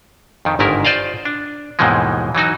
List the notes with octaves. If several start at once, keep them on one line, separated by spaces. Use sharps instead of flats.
F2 D#3
G1 G#2 D#3 E4 A#4
F4 C5 D5 D#5 F5
D4
D#2 G#2 B2 E3 F3 G#3
E3 F#3 D#4 F#4